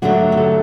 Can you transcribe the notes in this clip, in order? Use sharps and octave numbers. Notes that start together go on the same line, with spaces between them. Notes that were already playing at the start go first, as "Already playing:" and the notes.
D3 F#3 A3 D4 F#4
F#4
A4